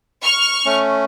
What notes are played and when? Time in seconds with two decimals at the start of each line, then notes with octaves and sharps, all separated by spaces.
0.23 C#6 F6
0.66 A3 C#4